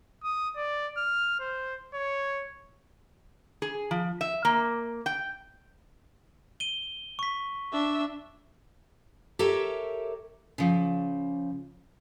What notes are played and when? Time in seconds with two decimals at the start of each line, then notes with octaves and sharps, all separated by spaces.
0.23 D#6
0.56 D5
0.97 F6
1.40 C5
1.94 C#5
3.62 G#4
3.91 F3
4.21 E5
4.45 A#3
5.06 G5
6.60 D#7 G7
7.19 C#6 B6
7.73 D4 E5
9.39 G4 A4 A#4 C#5 E5
10.58 C#3 F3